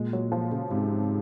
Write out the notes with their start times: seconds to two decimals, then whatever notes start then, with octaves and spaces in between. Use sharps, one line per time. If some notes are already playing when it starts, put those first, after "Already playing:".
Already playing: A#2 G#3
0.13 F#3
0.32 F3
0.51 C#3
0.71 G#2 C3